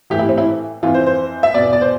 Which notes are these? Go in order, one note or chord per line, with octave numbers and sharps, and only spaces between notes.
A2 E3 G4
E4
C4
E4
F2 E3 F4
C5
C5
E5
E2 B2 D5
D5
C5